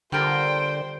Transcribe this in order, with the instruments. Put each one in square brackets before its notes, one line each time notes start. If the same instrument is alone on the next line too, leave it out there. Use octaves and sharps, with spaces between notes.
[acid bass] D3 [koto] G3 F4 A#4 [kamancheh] C5 [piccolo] G5